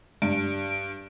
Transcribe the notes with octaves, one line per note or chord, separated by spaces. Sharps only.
G2 D7